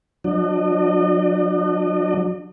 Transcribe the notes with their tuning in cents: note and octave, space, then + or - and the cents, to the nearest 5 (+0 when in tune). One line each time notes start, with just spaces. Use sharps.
F#3 -40 D4 +20 D#5 -40